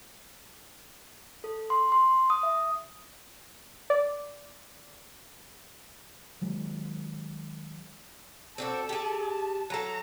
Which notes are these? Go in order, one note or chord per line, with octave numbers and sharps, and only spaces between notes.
A4
C6
C6
D#6
E5
D5
D#3 F#3 G#3
C4 D4 F#4 A4
G4 G#4
A5
F#3 A4 A#5